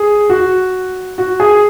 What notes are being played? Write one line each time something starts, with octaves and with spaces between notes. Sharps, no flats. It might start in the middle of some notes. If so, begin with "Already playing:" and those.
Already playing: G#4
F#4
F#4
G#4